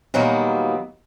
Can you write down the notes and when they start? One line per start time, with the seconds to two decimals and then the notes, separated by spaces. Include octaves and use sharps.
0.14 A#2 D#3 F#3 G3 A#3 B3